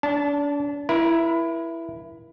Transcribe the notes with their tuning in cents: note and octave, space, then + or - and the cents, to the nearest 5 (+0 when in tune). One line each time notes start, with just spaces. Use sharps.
D4 -35 A5 +0
E4 +10 A#4 +45